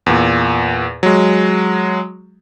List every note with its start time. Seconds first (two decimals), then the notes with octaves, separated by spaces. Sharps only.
0.06 E2 A#2
1.03 F#3 G#3